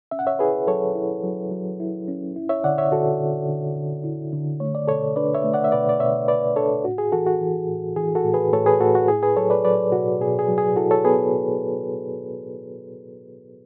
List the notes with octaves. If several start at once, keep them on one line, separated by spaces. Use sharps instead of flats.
C#4 E5
F#5
C#5 E5
E4 G#4 B4
F#3 A4 C#5
E4
F#3
F#3
E4
C#4
E4
C#5 E5
D3 D5 F#5
C#5 E5
D3 F#4 A4
D3
D3
D3
E4
D3
A3 C#5
D5
B2 A4 C#5
D4 B4 D5
C#5 E5
A3
D5 F#5
E5
B2 B4 D5
D5
B2 C#5 E5
B2 B4 D5
D4 A4 C#5
A2 F#4
G#4
E3 F#4 A4
F#4
E3
A2
E3 G#4
F#4 A4
A2
G#4 B4
A2 A4 C#5
G#4 B4
A2 F#4 A4
F#4
E4 G#4
G#4 B4
F#3 A4 C#5
B4 D5
F#3 B4 D5
B2 F#4
B2 G#4
G#4
F#3
G#4
E4 F#4 A4
A4 C#5
B3 G#4 B4